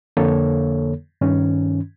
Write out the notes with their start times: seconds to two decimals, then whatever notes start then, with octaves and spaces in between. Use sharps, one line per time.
0.17 F2 D3 A#3 A4 C#5
1.21 G2 D#3 C#4